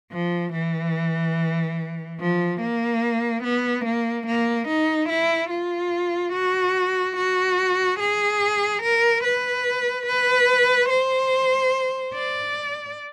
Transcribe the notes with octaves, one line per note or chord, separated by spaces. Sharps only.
F3
E3
F3
A#3
B3
A#3
A#3
D#4
E4
F4
F#4
F#4
G#4
A#4
B4
B4
C5
D5